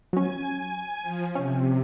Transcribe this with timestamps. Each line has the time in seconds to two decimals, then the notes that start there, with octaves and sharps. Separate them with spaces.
0.13 F#3 C#4 G#5
1.02 F3
1.35 C3 C#4